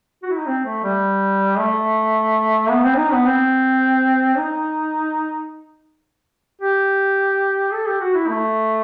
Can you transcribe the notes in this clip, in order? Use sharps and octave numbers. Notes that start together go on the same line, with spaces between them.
F#4
E4
D#4
C4
A3
G3
A3
B3
C4
D#4
B3
C4
D#4
G4
A4
G4
F#4
E4
A3